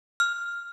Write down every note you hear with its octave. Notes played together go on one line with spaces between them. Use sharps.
F6